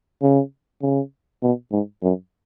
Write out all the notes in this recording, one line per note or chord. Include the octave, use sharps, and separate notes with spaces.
C#3
C#3
B2
G#2
F#2